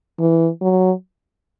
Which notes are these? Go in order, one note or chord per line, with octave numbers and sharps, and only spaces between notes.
E3
F#3